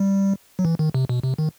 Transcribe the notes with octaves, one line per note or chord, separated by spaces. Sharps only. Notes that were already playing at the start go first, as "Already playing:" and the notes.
Already playing: G3
F#3
E3
D#3
C3
B2
C3
D#3